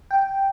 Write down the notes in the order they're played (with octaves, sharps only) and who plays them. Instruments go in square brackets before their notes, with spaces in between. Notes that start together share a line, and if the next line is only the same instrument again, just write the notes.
[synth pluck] G5